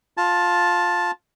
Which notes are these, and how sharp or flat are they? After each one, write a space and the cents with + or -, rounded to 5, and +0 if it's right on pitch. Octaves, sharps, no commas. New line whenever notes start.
F4 +15 A5 +0